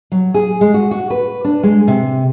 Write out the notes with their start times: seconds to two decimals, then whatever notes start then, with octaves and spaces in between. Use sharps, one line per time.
0.12 F#3
0.34 G#4
0.61 G#3
0.74 F#4
0.91 F#4
1.10 B4
1.44 D4
1.63 G#3
1.88 C3